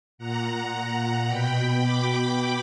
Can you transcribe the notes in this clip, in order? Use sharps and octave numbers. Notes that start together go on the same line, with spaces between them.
A#2 F#5 A#5
F#5 A#5
B2 G5 B5
B5 D6